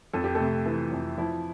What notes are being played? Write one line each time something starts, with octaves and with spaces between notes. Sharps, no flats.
F2 A4
G4
C3 A3 A4
E3
F2
F3 E4